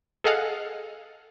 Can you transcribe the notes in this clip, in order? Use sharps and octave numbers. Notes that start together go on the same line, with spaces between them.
G#4 A4 D#5 F5 F#5